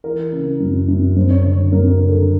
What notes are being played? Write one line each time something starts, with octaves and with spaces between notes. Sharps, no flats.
E3 A#4
C#3
F#2
F#2
F#2 C5
C#5
D3 C#5
F#2 A#4
A#4
D3
A4